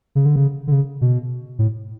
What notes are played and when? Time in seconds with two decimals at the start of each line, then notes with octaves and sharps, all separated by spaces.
0.15 C#3
0.25 D3
0.36 C#3
0.67 D3
0.72 C#3
1.01 B2
1.59 A2